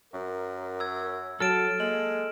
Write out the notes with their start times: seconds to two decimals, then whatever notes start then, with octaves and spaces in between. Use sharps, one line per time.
0.13 F#2 A#4
0.80 E6 G#6
1.40 F#3 A4 A5 F6 D7 E7
1.80 G#3 A#3 F#7